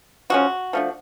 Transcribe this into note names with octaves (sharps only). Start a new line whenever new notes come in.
F3 G#3 C#4 F#4
F3 A3 D4